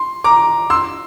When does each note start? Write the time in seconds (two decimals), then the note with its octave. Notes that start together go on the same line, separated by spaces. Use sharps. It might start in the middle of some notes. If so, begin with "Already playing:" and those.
Already playing: C6
0.24 A#5 D6
0.70 C6 E6